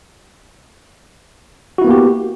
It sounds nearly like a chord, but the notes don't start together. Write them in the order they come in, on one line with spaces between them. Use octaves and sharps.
F#4 E4 B3 A#3 G4